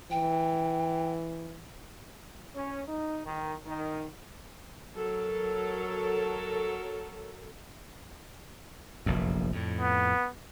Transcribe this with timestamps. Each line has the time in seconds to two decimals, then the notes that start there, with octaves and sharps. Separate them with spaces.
0.11 E3 G5
2.55 C#4
2.87 D#4
3.25 D#3
3.66 D#3
4.96 F#3 A4 A#4
9.06 F1 A#1 F#2
9.52 F2 A2
9.81 B3